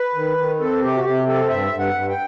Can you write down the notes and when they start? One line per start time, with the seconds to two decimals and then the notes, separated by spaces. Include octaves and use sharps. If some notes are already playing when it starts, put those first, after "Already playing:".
Already playing: B4
0.15 D#3
0.38 D#3
0.59 C4 A4
0.82 C3 G4
0.97 F#4
1.04 C3 G4
1.27 C4 A4
1.49 G2 E5
1.72 G2
1.79 F#5
1.94 G2
2.09 G5